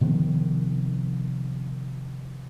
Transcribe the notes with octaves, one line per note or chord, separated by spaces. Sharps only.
C3 D#3 F3 B3